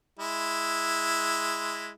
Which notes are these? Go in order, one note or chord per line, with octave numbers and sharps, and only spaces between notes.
G#3 E4